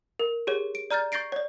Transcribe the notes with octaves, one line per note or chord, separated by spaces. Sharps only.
A#4
G4 G#4 C#5
D7
D5 A#5 F6 G6 A6
C#6 G6 A6 A#6 C7 D7
C#5 D5